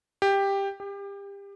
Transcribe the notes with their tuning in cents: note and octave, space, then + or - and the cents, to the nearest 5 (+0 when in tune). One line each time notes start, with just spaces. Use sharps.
G4 +10
G4 +30